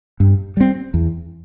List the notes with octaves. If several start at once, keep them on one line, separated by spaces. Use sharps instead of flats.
G2
G3 C4
E2